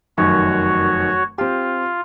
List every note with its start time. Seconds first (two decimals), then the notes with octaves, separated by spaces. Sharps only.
0.18 F1 F#2 D#3 F#4 C#5
1.38 C4 F4 G4